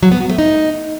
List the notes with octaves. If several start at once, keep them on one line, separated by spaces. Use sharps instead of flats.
F#3
B3
F#4
A3
D#4